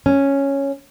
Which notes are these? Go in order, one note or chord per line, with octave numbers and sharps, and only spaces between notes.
C#4